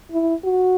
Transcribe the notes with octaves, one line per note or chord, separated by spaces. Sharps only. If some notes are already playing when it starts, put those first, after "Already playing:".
E4
F#4